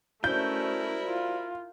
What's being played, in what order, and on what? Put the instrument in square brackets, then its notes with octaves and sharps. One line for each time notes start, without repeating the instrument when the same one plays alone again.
[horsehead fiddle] A3 C#4 [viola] E4 A#4 [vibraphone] F#4 C5 D5 [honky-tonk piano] G6
[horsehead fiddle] F4